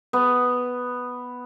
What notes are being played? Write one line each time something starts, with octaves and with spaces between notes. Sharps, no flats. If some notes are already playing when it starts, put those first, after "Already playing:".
B3